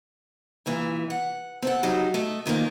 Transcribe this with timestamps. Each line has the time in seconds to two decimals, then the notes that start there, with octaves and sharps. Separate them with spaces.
0.66 G2 A#2 E3
1.10 F#5
1.62 C4 A4 F#5
1.83 C#3 F#3 G3 D#4
2.14 A3 A4 D#5
2.46 A#2 D#3 F3 A#3